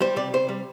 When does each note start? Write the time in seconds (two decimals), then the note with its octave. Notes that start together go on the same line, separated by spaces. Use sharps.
0.01 G3 C5
0.16 C3 D5
0.33 C3 C5
0.49 G3